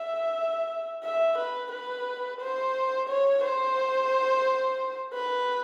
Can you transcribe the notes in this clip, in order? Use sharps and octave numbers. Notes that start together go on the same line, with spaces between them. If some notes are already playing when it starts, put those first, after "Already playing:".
Already playing: E5
E5
B4
B4
C5
C#5
C5
B4